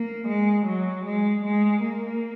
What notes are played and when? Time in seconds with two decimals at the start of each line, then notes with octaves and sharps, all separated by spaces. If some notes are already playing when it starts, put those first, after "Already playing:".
Already playing: A#3
0.28 G#3
0.66 F#3
1.05 G#3
1.44 G#3
1.82 A#3